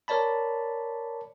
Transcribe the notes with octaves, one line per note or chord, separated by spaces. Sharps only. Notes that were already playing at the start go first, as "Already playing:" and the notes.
A#4 C#5 D5 A5 B5